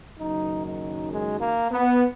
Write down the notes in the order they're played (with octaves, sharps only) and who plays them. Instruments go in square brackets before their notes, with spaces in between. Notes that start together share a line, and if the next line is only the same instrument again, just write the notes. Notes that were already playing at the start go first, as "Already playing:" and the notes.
[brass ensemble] F#1 F#2 D#3 F#3 D#4
D#4
G#3
A#3
B3